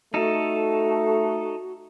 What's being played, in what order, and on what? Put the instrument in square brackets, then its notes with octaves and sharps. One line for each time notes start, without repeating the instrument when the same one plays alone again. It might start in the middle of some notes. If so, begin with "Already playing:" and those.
[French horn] A3 [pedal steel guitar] D#4 A4 [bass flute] F#4